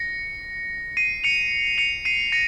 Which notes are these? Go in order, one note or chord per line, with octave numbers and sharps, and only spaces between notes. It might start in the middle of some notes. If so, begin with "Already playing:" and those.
Already playing: A#6 C#7
C7 D#7
C#7 F7
C#7 F7
C7 D#7
A#6 C#7